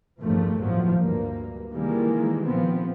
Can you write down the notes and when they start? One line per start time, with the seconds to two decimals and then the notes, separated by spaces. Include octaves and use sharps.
0.21 A#1 E2 G2 A#2 F3 A3
0.61 E2 A2 F3 F#3
0.96 D2 G2 A#3
1.72 C3 D#3 E3 G3 G#3 A#3
2.45 A#1 F3 B3 C4